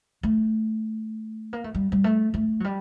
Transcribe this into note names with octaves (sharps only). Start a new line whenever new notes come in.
A3
A#3
A3
G3
G3
A3
A3
F#3
G3